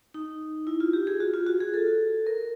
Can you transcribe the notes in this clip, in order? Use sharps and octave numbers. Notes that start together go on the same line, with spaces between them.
D#4
E4
F4
G4
G#4
F#4
F4
F#4
G#4
A4
A#4